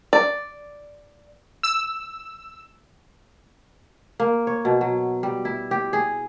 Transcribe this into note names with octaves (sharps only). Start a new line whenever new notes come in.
D5
E6
A#3
C#5
B2
F#3
G3
E4
G4
G#4